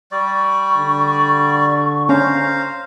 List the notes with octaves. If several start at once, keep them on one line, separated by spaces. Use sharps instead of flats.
G3 D5 C#6
D3
C#4 C5 F5 A#5